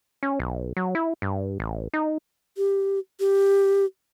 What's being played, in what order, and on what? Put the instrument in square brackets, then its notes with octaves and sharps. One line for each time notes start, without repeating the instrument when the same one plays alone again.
[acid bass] C#4
B1
F#3
E4
G2
A1
D#4
[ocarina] G4
G4